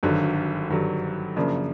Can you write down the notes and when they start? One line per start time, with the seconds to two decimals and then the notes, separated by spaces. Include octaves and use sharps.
0.03 G#1 G2 D3 F#3
0.69 G#1 G2 D3 F#3
1.36 F#2 C#3 F3 A#3 D4